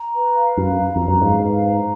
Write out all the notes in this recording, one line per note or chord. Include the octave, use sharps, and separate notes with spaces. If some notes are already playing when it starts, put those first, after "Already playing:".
Already playing: A#5
B4
F5
F#2 B4
A#5
F2 B4
F#2
G#2 F5
B4
A#5